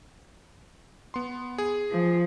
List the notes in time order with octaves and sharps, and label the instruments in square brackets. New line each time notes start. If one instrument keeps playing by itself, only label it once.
[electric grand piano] B3 C6
G#4
[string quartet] F3